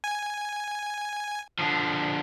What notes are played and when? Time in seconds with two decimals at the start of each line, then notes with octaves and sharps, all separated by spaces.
0.04 G#5
1.59 D3 F3